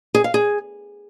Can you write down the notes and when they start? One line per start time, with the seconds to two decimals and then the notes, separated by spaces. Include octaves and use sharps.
0.14 G#4
0.24 F5
0.34 G#4